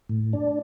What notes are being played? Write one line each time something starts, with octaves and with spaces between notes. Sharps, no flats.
A2
D4